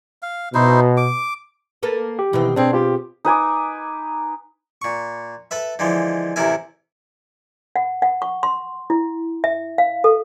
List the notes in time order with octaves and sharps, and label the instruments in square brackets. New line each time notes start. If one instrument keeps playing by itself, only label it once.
[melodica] F5
[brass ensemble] B2 [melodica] D#4 E4 C5
[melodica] D6
[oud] A#3 A4 B4
[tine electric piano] G4
[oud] B2 D#3 C4 [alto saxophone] E3
[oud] B2 G#4 [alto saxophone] C4 [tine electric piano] D4
[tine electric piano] C4 F4 [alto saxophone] G4
[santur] D#4 B4 G#5 D6
[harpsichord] A#2 C#6
A4 B4 E5
D3 E3 F3 G#3
A1 C3 E4 A#4 E5 G#5
[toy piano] F#5
F#5
C#6
C6
E4
E5
F5
A4